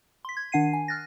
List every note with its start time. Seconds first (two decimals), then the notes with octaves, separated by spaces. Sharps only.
0.25 C6 B6
0.37 G#6
0.52 D#3 D4 F#5 C7 D#7
0.73 G#5
0.88 F6 F#6 A6 A#6